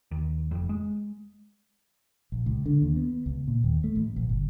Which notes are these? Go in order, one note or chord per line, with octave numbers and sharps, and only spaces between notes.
D#2
F1 F2
G#3
A#1
C#2
D3
D#2
B3
C#2
A#2
D#2
A3
A1
A#1
G1